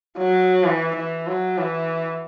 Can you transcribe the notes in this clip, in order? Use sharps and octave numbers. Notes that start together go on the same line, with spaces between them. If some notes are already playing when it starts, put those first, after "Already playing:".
F#3
E3
E3
F#3
E3